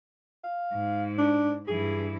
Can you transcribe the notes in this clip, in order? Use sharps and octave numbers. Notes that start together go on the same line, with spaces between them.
F5
G#2
D4
G2 E3 G#4